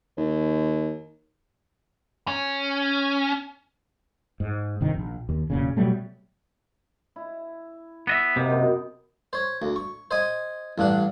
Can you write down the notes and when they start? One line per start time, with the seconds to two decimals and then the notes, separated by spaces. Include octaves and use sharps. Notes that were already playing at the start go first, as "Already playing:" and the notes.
0.17 D#2
2.28 C#4
4.40 G#2
4.81 G1 C3 D#3
4.94 A#1
5.29 D#2
5.50 E1 A#2 C#3
5.77 B2 F#3 G3 A3
7.16 E4
8.07 B3 D#5 E5
8.36 C3 A#3 B3 D#5
8.50 F#2 B2 G5
9.33 C5 C#5
9.62 D2
9.76 C#6
10.11 C5 D#5 G#5
10.78 A1 G2 D4 F#5